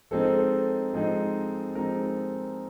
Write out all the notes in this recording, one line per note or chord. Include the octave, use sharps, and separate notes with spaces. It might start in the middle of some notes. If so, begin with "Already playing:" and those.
F3 G#3 C4 D#4 A4
A#4
A4
F3 G#3 C4 D#4
F3 G#3 C4 D#4 A#4